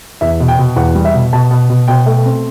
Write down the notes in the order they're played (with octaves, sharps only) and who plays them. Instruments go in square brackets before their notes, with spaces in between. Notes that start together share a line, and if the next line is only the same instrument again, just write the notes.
[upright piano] E2 E5
B2
G5
B2
E2 F#5
G3
E5
B2
B2 A5
B2
B2
B2 G5
A3
C4